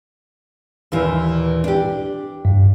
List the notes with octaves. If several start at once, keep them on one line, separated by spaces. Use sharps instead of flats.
D#2 A#2 E3
D4 G4
G2